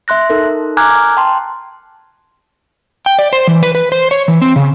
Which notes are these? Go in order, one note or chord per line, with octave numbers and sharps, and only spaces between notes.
E5 C6 F#6 A#6
D#4 A4 A#4
G#5 A#5 D6 F6 F#6 G#6
G5 A5 C6
G5
D5
C5
E3
B4
B4
C5
C#5
E3
C4
C#3